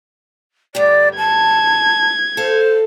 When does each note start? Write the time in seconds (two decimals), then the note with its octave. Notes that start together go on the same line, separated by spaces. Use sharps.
0.75 D2 G2 G4 D5
1.18 A5 G#6
2.37 A4 C5 F5